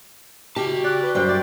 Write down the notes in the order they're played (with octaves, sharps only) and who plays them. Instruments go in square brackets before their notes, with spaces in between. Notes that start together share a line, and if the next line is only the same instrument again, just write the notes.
[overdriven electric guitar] F#4 A5 [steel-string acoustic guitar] G4
[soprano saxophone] D5 [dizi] F#6
[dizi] B4
[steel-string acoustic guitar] F#2 G3 G5 [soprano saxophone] C5 [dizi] F#6
[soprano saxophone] D5